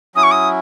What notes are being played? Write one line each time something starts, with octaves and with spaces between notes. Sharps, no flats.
F#3 C#4 E4 D#6
C#6
D#6